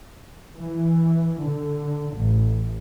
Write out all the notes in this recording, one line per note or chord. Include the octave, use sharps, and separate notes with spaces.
E3
D3
A1